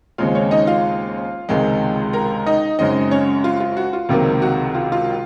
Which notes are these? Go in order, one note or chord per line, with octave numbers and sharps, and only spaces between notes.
D#2 C#3 G#3 C4 F4 F5
C#4 C#5
D#4 D#5
F4 F5
C#2 C3 D#3 G#3
A#4 A#5
D#4 D#5
F#2 C#3 G#3 C4 D#4 D#5
C#4 C#5
F4
F4
F#4
F4
C#2 C3 D#3 F#3 A#3
F#4
F4
F4